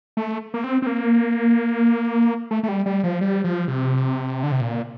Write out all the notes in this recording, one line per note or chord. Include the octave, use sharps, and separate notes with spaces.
A3
A#3
C4
C4
A#3
A3
A3
G3
G3
F3
G3
F3
C3
D3
C3
A#2